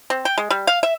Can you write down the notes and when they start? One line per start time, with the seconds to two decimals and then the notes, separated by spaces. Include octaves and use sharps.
0.10 C4
0.25 G5
0.38 G#3
0.50 G3
0.67 F5
0.83 E5